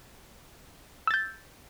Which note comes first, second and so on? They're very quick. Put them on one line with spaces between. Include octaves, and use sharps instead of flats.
E6 A6 G6